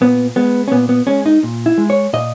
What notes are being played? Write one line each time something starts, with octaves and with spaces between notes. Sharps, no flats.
A#2 B3
G#3 B3
C#4
A#2 B3
B3
G#3 C#4
D#4
A#2
E4
G#3
C#5
A#2 D#5